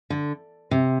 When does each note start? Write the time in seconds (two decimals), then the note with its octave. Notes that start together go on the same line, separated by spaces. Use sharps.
0.10 D3
0.71 C3